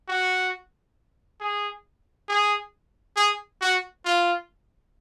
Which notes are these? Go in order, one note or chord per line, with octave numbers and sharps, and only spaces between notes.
F#4
G#4
G#4
G#4
F#4
F4